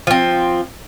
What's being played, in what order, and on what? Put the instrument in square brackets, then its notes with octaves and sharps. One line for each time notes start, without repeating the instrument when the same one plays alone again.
[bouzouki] F3 C4